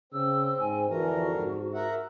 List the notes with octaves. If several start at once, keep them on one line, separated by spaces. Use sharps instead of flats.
C#3 C4 E6
G#2 G#5
F2 D3 E3 F#4 A#4
G#2
A#4 E5 F#5